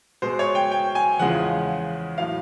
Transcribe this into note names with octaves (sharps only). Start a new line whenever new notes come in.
B2 G#3 C5
C#5
G5
G5
G#5
E2 C#3 F3 G#3 F#5
A2 F#3 F5